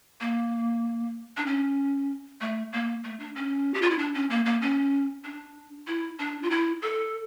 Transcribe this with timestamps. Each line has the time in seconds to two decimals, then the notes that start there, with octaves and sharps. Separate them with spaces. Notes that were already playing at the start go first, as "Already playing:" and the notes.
0.21 A#3
1.37 D4
1.46 C#4
2.41 A3
2.73 A#3
3.04 A3
3.20 D4
3.35 C#4
3.74 G4
3.82 F4
3.90 E4
3.98 D4
4.14 C#4
4.30 A#3
4.46 A#3
4.62 C#4
5.24 D4
5.87 E4
6.19 D4
6.43 F4
6.50 E4
6.82 A4